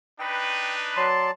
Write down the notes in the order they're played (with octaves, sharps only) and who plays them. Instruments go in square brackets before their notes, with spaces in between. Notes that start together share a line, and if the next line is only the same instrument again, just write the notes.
[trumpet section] D4 D#4 B4 [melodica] G5
[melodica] F#3 D5 A5 [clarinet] C6